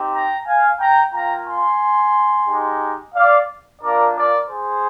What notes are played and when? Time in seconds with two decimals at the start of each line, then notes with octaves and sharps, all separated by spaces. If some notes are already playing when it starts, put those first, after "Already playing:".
Already playing: C4 D#4 G4
0.13 G5 A#5
0.47 F5 G#5
0.80 G5 A#5
1.13 A#3 F4 G5 A#5
1.47 G#5 C6
2.48 G#3 D#4 G4
3.15 D5 F5
3.82 A#3 D4 F4 A#4 D5
4.16 A#4 D5
4.50 G#4 C5